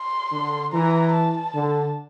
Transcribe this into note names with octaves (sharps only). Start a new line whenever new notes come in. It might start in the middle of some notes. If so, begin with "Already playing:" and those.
Already playing: C6
D3
E3 A#5
A5
D3